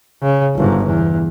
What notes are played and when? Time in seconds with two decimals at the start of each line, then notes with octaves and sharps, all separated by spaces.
0.22 C#3
0.56 G1 G#2
0.85 E2